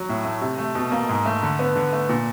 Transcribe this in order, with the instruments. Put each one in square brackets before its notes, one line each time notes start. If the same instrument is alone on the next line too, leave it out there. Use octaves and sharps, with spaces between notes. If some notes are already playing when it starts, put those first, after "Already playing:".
Already playing: [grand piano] F#3
A2
A3
C3
A3
B2
A#3
G#2
A3
D3
B3
D3
A3
A#2